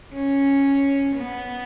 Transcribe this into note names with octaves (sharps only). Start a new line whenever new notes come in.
C#4
B3